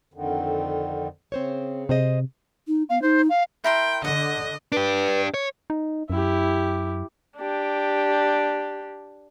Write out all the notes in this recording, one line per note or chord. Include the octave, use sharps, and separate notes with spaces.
F2 D3 D#3
C#3 C4 C5 C#5
C3 G#4 C5 D#5
D#4
B3 F5
D#4 C5
F5
E4 A#4 G5 C6
D3 D#5 F#5
D4 G4 B4
C#5
D#4
F#2 E4 G4
D4 G4